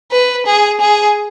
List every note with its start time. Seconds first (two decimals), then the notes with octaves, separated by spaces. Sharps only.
0.12 B4
0.47 G#4
0.81 G#4